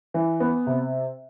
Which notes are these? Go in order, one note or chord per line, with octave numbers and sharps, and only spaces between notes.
E3
B3
C3